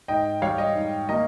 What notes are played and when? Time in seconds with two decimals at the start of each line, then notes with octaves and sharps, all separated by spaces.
0.08 G#2 D#5 G5
0.42 G3 C#5 F5
0.58 D#5
0.75 G#2
1.09 A#3 D#5